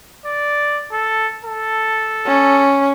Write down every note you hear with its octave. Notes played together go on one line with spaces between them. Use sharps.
D5
A4
A4
C#4